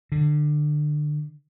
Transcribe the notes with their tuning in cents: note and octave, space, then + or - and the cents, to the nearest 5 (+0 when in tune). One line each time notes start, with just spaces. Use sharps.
D3 +25